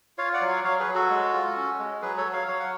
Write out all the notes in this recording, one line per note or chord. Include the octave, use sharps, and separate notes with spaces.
F4 C#5 F5
D5 F#5
F#3
C#5 F5
F#3 C#5 F5
G#4 B4
F#3
F#4 A4
G#3
F4
C#4
G#3
F#3 G#4 B4
A4 C#5
F#3
C#5 F5
F#3 C#5 F5
F#5